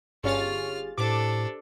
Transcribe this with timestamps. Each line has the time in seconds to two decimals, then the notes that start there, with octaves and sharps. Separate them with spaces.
0.24 G1 C#4 F4 G4 G#4 C#6 F6 A6
0.98 A2 D4 G4 A4 C5 D6